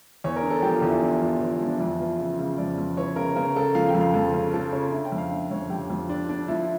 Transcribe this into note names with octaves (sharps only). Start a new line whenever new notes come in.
E2 C#5
A#4
D3
A4
F3 G4
F4
E2
E4
D3
E2 F4
E2 F4
E4
F3
D4
F2 E4
E3 F4
C#3
C#3
F2 D5
F2
E3 C#5
C#3 A#4
C#3 A#4
C#3 A4
F3 F5
G5
F2
F5
F2 A4
C#3
F3 A4
C#3 C#5
D3 E5
G5
F2
F5
D3 E5
F2 C#5
F2 G4
F2 F4
D3 D4
D3 D4
F3 E4